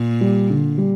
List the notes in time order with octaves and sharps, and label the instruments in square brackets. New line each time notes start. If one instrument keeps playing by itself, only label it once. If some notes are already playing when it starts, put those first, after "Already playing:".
Already playing: [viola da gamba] A#2
[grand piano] G3
D3
G3